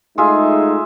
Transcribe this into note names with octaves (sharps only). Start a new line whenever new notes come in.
G#3 A3 D#4 F4 G#4 E5